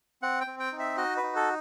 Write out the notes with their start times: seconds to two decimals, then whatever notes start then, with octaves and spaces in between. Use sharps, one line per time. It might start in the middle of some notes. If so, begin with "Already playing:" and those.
0.22 C4 F#5
0.41 G5
0.47 C4
0.60 G5
0.72 D#4
0.79 E5
0.97 F#4 D#5
1.17 B4
1.23 D#4
1.36 A4